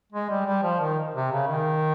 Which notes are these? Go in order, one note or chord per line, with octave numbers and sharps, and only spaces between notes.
G#3
G3
G3
F3
D#3
C3
C#3
D#3